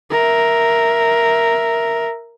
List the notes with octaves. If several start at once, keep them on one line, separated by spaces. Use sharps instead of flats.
A#4 E5